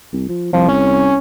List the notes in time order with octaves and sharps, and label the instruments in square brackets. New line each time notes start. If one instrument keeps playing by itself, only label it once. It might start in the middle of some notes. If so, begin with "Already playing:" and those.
[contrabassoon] C2
F3
[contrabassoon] C2 [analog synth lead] F3
[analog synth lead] C#4